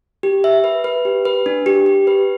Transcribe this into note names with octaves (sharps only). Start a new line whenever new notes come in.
G4
E5
B4
B4
G4
B4
D4
G4
G4
B4